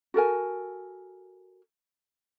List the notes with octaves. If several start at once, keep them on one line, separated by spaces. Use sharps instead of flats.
F#4 A4 A#4 G#5